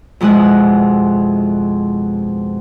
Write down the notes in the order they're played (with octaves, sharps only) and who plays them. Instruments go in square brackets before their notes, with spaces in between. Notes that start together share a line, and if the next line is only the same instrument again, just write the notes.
[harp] F2 B2 G#3 E4 F#5